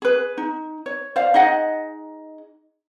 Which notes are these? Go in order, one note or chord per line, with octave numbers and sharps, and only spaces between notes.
G#4 B4
D#4
C#5
C5 D5 F5
D#4 G#4 D#5 F#5